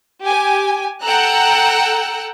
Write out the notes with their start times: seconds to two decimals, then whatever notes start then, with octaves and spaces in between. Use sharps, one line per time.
0.22 G4 G#5
1.03 A4 F#5 G5 A#5 E6 F#6